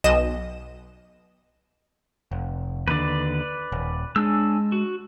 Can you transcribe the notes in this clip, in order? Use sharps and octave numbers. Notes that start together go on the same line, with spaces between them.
B1 D#5 E7
F1
D#2 D3 B4 D5
D#1
G#3 C#4 D4 E6
F#4